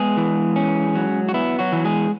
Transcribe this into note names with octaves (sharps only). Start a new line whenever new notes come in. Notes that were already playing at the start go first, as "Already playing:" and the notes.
Already playing: G#3 B3 G#4
E3
C#4
F#3
F#4
B3 E4
F#3 F#4
E3
G#3 G#4